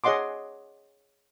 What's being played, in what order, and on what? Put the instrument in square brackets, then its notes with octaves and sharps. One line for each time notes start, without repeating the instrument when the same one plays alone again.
[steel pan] G#4 C#5 D#5 F#5 C6 D6